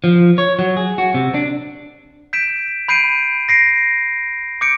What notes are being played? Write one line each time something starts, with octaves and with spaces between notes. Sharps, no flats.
F3
C#5
F#3
G#4
F#4
C3
D4
G6 B6 D7 E7
B5 G6 C7 D7 D#7
A#6 C7 D7
D6 G6 C#7 D7